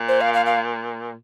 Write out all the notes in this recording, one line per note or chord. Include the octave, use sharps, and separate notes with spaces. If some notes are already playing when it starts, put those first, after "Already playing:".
Already playing: A#2
C5
F5
F5
F5